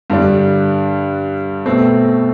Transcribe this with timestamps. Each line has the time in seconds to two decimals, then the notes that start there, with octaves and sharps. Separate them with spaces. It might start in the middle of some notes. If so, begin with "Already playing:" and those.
0.10 G2 D3 G3 D4
1.66 B2 A3 C4